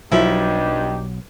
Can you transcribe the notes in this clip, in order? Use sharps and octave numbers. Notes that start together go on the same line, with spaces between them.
B1 G2 F3 F#3 D#4 E4 G4